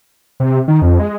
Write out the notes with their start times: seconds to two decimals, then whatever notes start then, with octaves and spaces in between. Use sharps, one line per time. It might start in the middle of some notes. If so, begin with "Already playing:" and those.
0.40 C3
0.68 D#3
0.82 F2
1.00 G#3